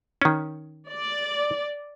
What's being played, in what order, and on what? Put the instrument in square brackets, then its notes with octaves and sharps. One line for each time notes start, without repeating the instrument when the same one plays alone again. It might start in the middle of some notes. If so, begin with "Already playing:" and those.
[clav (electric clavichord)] D#3 C#4
[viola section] D5